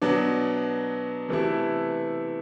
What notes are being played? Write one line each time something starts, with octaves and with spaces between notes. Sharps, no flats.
B2 F#3 B3 D4
C3 E3 A3 E4